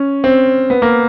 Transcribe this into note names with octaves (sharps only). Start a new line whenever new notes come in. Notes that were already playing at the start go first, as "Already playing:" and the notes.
Already playing: C#4
C4
B3
A#3